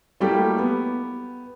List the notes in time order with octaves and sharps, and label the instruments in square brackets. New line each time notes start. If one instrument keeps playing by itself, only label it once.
[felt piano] F#3 G3 A3 A#3 E4 G4
B3